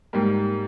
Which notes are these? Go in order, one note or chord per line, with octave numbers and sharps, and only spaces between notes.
G#2 G3 A#3